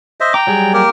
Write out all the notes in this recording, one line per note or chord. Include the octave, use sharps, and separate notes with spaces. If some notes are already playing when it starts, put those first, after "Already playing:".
C5 D#5 E5
G5 A#5 D6
F#3 G3 G#4
A#3 G4 A#4